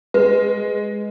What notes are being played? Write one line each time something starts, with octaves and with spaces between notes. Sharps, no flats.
G#3 B4